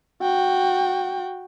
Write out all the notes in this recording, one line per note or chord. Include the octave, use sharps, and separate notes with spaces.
F#4 G5